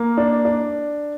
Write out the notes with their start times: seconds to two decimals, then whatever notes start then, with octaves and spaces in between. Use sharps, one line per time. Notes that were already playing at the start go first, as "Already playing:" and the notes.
Already playing: A#3
0.18 D4
0.45 D4